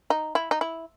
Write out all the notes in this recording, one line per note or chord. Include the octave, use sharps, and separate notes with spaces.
D#4
E4
D#4
E4